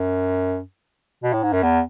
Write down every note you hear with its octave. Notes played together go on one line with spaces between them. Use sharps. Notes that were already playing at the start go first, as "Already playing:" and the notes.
Already playing: F#2
B2
A2
G#2
F#2
E2